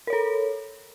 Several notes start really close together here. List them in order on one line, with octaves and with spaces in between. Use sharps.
A#4 C#5 A4